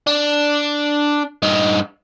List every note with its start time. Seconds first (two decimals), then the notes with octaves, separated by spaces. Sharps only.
0.07 D4
1.43 G2 D#4